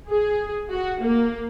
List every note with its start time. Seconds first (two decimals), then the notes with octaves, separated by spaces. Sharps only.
0.11 G#4
0.71 F#4
1.02 A#3